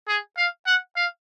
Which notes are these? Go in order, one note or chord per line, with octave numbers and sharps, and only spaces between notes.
G#4
F5
F#5
F5